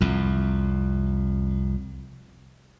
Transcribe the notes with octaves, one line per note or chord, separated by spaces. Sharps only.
C2 F2